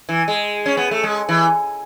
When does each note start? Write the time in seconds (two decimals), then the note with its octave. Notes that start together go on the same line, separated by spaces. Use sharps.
0.09 E3
0.28 G#3
0.66 C#4
0.77 B3
0.91 A3
1.03 G#3
1.29 E3